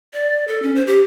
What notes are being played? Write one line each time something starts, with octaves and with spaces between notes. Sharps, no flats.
D5
A4
C#4
C5
G4